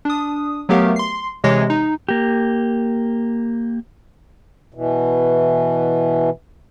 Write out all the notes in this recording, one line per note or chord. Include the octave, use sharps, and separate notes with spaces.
D4 D#6
F#3 A3 B3 G4 A#4 F5
C6 C7
C3 E3 G#3 C#5 A#6 C7
D#4
A#3 G4
B2 E3